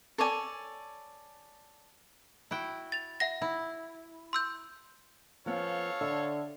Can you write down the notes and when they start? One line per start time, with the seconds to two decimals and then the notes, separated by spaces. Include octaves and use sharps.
0.18 A4 C#5 D5 G#5
2.51 E4 F#4 G5
2.92 A6 F7
3.20 E5 F#5 A#6
3.42 E4
4.33 C6 E6 G6
5.46 F3 B3 C#4 A4 C#5 F5
6.01 D3 E5